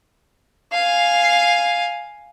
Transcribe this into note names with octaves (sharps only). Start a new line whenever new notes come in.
F5 G#5